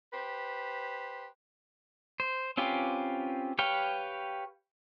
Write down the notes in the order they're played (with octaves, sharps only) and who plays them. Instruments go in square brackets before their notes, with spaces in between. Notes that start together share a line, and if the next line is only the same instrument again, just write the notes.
[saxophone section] G4 B4 C5
[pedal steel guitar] C5
C4 C#4 F4 G4 B4
G4 B4 C#5 F5 G5